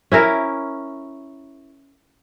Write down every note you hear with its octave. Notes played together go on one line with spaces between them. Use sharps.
C#4 E4 A#4